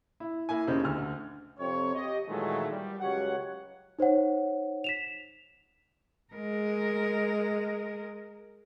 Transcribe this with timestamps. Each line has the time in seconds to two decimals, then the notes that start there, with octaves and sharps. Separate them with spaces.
0.20 E4
0.49 A#3 E4 G#5
0.67 E1 C#3 D#4 G4 C5
0.84 D2 D3 F6
1.59 F2 C3 C4 C#5
1.95 G4 D#5
2.28 A#2 D#3 E3 F#3 G#3 A3
2.70 G3
3.00 C#2 F#3 G4 C#5 F#5
3.99 D#4 C5 C#5 F#5
4.84 B6 E7 F7
6.34 G#3 A#4